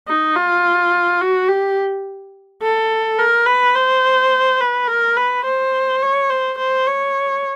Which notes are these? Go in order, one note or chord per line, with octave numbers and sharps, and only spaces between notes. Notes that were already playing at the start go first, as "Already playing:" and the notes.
D#4
F4
F#4
G4
A4
A#4
B4
C5
B4
A#4
B4
C5
C#5
C5
C5
C#5